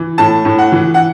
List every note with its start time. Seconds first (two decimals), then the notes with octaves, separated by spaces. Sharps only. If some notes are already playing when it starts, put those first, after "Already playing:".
Already playing: E3
0.18 A2 A5
0.45 A2
0.58 F#5
0.72 E3
0.94 F#5